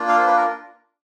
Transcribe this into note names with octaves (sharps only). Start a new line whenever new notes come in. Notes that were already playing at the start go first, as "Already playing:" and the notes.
Already playing: A#3 D4 F4
F5
C5
B4
A#4